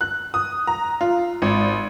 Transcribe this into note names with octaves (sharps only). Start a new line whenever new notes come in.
F#6
D#6
A#5
F4
G#1